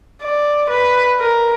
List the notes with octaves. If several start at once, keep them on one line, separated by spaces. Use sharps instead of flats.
D5
B4
A#4